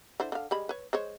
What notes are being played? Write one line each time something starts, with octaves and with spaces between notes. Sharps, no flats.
D3 E4 C5
D3 F5
G3 G#3 B5
B4 C#5
G#3 C5 C#5